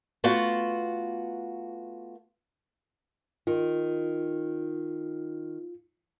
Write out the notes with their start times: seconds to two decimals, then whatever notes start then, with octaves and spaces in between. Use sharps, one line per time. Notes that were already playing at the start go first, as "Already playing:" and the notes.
0.24 A3 B3 F4 F#4
3.47 D#3 F4